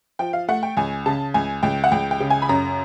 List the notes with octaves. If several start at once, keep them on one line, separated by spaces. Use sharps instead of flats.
F3 G5
F5
A3 F#5
G5
C#2 G#5
C#3 A5
C#2 G#5
C#2 G5
F#5
C#2 G5
G5
C#3
G#5
B5
F#2 A#5